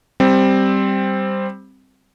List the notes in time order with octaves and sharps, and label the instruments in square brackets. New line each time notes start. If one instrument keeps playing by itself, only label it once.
[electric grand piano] G3 C4